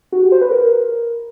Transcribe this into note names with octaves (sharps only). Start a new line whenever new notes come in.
F#4
G4
C5
B4
A#4